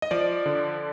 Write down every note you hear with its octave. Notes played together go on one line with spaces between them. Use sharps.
D#5
F3 D5
D3